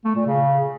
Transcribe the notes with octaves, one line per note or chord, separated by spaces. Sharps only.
A3
A#2
C#3